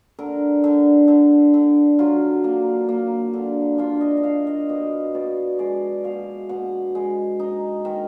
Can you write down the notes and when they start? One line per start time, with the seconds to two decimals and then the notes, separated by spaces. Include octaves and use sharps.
0.19 D3 A#4
0.64 D3
1.08 D3
1.54 D3
1.99 F#3 F4
2.44 A#3
2.89 A#3
3.34 D3
3.78 D4 F4
4.01 D#5
4.17 D#5
4.23 D4 F5
4.47 D#5
4.69 B2 D#5
5.15 B2 D5
5.59 G#3 D5
6.04 B2 F5
6.49 B2 F#5
6.95 G#3
7.40 D#4
7.85 D#3